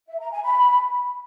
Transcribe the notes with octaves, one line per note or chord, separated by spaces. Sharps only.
E5
A#5
G#5
B5